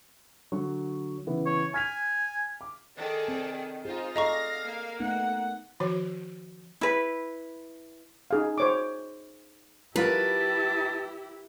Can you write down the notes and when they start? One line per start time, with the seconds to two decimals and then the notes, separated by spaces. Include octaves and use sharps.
0.52 D3 F#3 C#6
1.26 C#3 E3 B3
1.46 C#5
1.74 G#5 F6 B6 F7
2.61 D6
2.97 D#3 G#4 A4 D5
3.28 C4
3.85 D#4 F4 G#4 C5
4.16 G#4 A4 D5 D#5 F5 A#5 C#6 A#6
4.65 A#3
5.00 A3 B3 D#4 F#5
5.80 D#3 F3 F#4 C#5
6.81 E4 B4
8.31 D#4 G#4 F5
8.58 C5 C#5 D6
9.96 F#3 E4 F4 G4 A#4 B4 A5